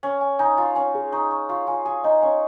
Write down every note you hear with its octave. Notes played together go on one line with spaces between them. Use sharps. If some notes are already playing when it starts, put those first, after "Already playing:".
C#4 G#5
G#5
D#4 G#5
F4 G#5
C#4 G#5
G#4
D#4 C#6
C#6
F4 C#6
F4 G#5
G#4 G#5
D#4 D#5
C#4 G#5